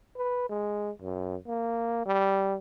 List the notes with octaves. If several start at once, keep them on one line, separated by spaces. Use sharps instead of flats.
B4
G#3
F#2
A#3
G3